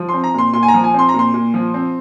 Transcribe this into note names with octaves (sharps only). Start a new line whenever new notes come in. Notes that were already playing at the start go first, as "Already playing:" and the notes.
Already playing: F3
C6
C4
A#5
A#2 C6
A#2 C6
G#5
A#5
F3
G#5
C4 C6
A#2 A#5
C6
A#2
F3
C4